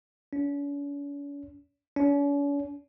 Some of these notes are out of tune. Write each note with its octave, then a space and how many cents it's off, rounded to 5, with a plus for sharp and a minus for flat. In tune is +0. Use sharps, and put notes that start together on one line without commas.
C#4 +45
C#4 +45